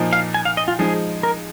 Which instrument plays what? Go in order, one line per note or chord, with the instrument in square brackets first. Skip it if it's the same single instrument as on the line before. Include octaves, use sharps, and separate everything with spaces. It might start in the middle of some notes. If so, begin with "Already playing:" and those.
Already playing: [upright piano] A#2 F3 A#3 D#4
[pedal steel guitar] F5
G#5
F5
D#5
F4
[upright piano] F3 G#3 D#4 [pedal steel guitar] G#4
[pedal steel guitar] A#4